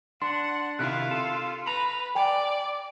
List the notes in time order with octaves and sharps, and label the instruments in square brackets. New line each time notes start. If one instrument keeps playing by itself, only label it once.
[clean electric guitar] D4 [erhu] F#5 [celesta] C6
[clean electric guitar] C3 D#3 E4 [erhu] F4 [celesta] F#6
[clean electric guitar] A4
[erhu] B4 [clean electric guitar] A#5 B5
[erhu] D5 [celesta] G5 G#5